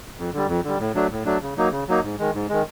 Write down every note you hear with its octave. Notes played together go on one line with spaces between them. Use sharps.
F2
D3 G3
F2
D3 G3
A2
F#3 A3 D4
A2
F#3 A3 D4
C#3
F#3 A#3 D#4
C#3
F#3 A#3 D#4
G#2
D#3 G#3
G#2
D#3 G#3